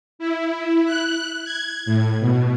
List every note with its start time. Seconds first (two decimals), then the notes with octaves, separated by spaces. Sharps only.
0.19 E4
0.85 F#6
1.45 G#6
1.86 A2
2.20 B2